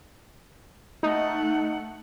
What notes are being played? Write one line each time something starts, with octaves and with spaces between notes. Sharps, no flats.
A3 D#4 F#5